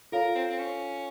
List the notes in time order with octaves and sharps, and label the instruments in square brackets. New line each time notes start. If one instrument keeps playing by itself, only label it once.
[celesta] F4 A4 C#5 F5 [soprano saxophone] A#4
[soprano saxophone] C4
C4
C#4